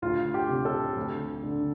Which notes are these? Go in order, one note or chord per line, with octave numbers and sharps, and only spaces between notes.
D2 F4
G4
C3
A4
D2
D3